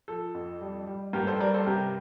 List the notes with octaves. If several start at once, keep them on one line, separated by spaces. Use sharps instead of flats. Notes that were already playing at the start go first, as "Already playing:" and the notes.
F3 A4
F2
G3
G3
G2 G4 A#4
A4 C5
G3 A#4 D5
A4 C5
C3 G4 A#4